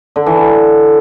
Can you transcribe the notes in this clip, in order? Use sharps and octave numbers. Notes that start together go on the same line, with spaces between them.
D3
E3
D3